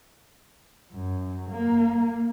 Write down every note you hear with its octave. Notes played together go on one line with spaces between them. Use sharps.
F#2
A#3